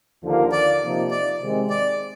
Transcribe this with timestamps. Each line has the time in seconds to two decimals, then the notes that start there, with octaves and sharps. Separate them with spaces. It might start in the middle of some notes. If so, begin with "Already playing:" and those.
0.22 D#2 D3 F3 A#3
0.52 D5
0.81 C3 F3 A#3 D#4
1.11 D5
1.40 C3 D#3 G#3 C4
1.70 D5